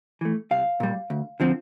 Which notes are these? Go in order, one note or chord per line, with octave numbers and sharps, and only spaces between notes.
E3 A3
C2 F5
A#2 G3
D2
D3 F3 C4